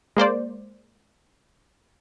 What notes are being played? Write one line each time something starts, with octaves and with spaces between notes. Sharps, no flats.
G#3 A#3 C5 D5